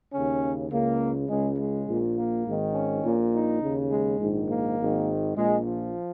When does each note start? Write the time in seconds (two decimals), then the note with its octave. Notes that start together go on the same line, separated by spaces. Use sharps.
0.11 D#2 C#3 C#4
0.69 C#2 C#3 A#3
1.27 C#2 C#3 G#3
1.57 G#3
1.86 A#1 A#2
2.16 A#3
2.44 G#1 G#2 D#3
2.73 C#4
3.03 A#1 A#2
3.32 D#4
3.60 D#2 C#3
3.89 G#3
4.18 A#1 G#2 D#3
4.48 A#3
4.77 G#1 G#2 D#3
5.35 A#1 A#2 G#3
5.63 F3